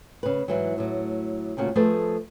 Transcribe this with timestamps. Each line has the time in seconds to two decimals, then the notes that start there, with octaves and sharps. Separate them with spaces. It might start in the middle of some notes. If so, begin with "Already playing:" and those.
0.23 C#3 B4
0.48 G#2 E3 F#3
0.78 A2 F#3
1.57 D2 A#2 C#3 F#4
1.76 F3 A3 G#4 A4 B4 C5